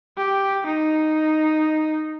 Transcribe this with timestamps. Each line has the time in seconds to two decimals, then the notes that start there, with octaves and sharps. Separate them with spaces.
0.17 G4
0.66 D#4